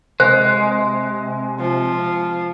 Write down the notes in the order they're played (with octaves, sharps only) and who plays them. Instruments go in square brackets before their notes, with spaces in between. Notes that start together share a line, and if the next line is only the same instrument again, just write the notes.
[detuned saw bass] C3 [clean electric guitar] G#3 [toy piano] C5
[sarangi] F3